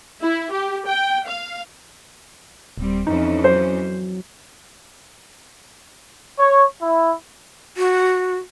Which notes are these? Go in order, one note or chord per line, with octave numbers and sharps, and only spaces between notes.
E4
G4
G5
F5
D#1 G3 C4
F2 E3 C#4 D#4
F#3 C5
C#5
E4
F#4